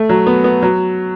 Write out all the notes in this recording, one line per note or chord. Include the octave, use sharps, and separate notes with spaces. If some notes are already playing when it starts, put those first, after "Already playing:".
Already playing: A3
F#3
B3
B3
F#3